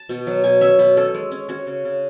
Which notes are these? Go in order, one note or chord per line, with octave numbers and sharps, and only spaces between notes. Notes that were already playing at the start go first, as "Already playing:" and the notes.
Already playing: A5
B2
F#3
B2 G#5
C#4 E5
B2 B4
C#4 A4
G#3
C#4
C#4 F#4
C#3
C#3